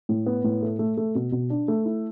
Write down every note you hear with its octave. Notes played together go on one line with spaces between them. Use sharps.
A2
B3
A2
A3
A3
A3
B2
B2
D4
A3
E4